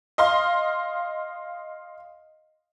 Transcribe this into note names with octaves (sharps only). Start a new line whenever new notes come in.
D#5 F5 C6